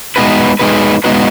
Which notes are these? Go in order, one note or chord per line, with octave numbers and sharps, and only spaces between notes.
G#3 B3 D#4 F#4 B4
G#3 B3 D#4 F#4 B4
G#3 B3 D#4 F#4 B4